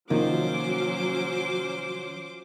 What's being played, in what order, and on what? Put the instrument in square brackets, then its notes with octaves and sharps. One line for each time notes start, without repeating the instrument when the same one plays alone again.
[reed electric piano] C3 D#3 [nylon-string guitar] F3 A#3 [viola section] F#3 C#4 [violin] C5 D6